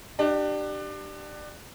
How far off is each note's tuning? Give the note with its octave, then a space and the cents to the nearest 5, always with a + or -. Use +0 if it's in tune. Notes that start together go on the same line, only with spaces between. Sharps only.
D4 +25 G4 -15